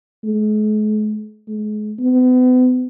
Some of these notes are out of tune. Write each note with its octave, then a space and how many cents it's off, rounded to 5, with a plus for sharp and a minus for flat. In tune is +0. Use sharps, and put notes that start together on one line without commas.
G#3 +45
G#3 +35
B3 +40